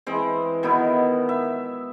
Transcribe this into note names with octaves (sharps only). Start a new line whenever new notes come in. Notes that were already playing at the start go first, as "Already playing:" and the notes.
E3 G#3 C4
B2 D#3 B3 E4
E5